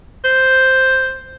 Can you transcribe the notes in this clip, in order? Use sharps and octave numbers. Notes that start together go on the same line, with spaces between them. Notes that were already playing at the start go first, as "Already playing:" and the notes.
C5